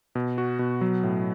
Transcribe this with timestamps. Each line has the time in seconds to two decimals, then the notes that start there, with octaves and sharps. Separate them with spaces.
0.15 B2
0.38 F#4
0.59 B2
0.81 F#3
1.03 A2